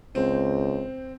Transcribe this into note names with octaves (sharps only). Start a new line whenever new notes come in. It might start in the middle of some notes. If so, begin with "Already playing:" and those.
C#2 C4